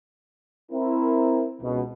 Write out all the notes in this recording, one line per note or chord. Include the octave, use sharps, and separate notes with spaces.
C4 E4 A#4
C#2 B2